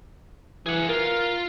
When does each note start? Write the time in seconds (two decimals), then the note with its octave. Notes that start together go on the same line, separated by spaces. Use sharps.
0.66 E3 G#4 F#5
0.89 F4 A#4 F5